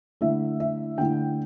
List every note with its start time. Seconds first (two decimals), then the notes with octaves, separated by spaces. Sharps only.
0.21 D3 A3 E4 E5
0.60 E5
0.98 D3 A3 E4 G5